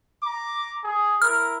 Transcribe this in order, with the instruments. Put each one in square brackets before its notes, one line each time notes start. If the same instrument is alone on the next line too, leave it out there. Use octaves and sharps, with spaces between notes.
[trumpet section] A#5 D6
G#4
[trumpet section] E4 A#4 [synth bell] F6